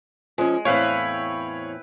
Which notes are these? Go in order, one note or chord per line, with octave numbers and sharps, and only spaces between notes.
F3 G#3 C#4
E2 A2 C4 E4 B4 C#5 F5 G5